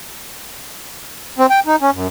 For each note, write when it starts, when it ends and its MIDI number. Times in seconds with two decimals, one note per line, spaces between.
1.38 1.46 60
1.50 1.60 79
1.66 1.76 63
1.81 1.91 61
1.93 2.07 42